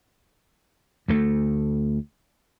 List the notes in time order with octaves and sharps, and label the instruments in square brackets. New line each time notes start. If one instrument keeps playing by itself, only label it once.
[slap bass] D2 A3